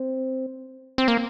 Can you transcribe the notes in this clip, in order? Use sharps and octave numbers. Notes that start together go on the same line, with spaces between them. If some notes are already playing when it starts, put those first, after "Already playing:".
Already playing: C4
C4
A#3